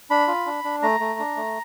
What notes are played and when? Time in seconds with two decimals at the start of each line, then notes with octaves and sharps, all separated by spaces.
0.10 D4 B5
0.28 F4
0.46 D4
0.64 D4
0.83 A3 A#5
1.00 A3
1.19 D4
1.36 A3